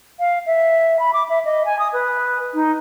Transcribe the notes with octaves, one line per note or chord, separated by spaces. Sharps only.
F5
E5
B5
D6
E5
D#5
G#5
D#6
B4
D#4